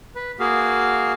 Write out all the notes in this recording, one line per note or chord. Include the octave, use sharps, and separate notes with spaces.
B4
A#3 F#4 G#4 F5